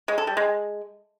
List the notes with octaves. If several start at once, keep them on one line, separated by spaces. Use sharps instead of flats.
G#3
A4
G3
G#3